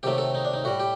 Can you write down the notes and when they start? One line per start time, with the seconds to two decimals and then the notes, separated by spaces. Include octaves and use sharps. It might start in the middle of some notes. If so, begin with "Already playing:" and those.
0.03 C3 D#3 F#3 A3 G4
0.18 A4
0.34 D#4
0.45 D4
0.54 D#4
0.64 A2 G3 F#4
0.80 G4